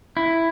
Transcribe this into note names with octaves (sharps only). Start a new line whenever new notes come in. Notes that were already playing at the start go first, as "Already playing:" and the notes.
E4